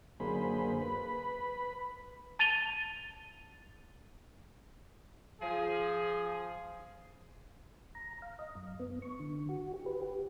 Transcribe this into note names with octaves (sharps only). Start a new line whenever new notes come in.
F#2 D3 A#3 G#4 C5 B5
B4 B5
A5 A6 D#7 F7 G7
F3 G#4
A#5
F5
D#5
F#2
B3
C#6
D3
F#4
G4
B4
G4